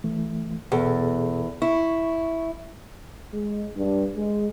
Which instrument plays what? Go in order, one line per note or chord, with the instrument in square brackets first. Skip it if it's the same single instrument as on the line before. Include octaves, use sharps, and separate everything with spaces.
[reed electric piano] E3 A3
[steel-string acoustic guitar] E2 [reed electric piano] B2 G#4 A4
[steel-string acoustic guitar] E4 [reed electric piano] C#6
[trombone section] G#3
G2
G#3